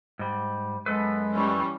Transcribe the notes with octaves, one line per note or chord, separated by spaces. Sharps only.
G#2 G3
F#2 G#3 A3 B3 A4 B4
E3 G3 C#4 E4 C#6